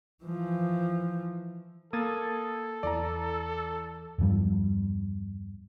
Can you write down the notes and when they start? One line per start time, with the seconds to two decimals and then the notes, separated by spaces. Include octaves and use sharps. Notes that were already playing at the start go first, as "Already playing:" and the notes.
0.24 E3 F3
1.93 A#3 A4 D#6 G#6 A6
2.83 E2 E3 D5 A#5
4.18 E2 G2 F3 G3